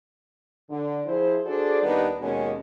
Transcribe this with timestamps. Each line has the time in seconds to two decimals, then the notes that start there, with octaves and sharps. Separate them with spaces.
0.69 D3
1.05 F3 E4 G#4 C5
1.45 D4 F#4 G#4 A4 C5 D5
1.82 D#2 G3 B3 D4 D#4 B4
2.20 D#2 B2 G#3 A#3 C#4